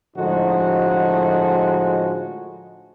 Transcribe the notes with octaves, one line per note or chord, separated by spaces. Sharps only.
A2 D3 F3 G#3 D#4 F#4